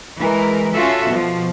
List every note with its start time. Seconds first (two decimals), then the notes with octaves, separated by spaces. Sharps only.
0.20 E3 G#3 A#4
0.74 C#4 F4 F#4 A4 E5
1.07 B2 F3